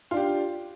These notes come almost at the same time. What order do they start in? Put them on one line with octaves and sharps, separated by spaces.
F4 D4 G4